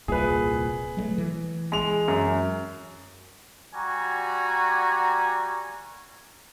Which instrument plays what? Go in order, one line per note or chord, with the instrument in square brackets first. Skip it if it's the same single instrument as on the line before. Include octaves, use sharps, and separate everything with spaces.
[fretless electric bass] D#1 C2 A#2 [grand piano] G#4 B4
[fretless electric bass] F#3 G#3 A3
E3
[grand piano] G#3 F7
F#2
[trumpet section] G3 F#4 G#5 A#5